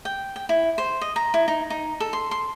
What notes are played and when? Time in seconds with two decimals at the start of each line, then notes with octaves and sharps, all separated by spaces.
0.05 G5
0.36 G5
0.49 E4
0.78 C5
1.01 D#5
1.16 A#5
1.34 E4
1.48 D#4
1.70 D#4
2.00 A4
2.13 C6
2.31 C6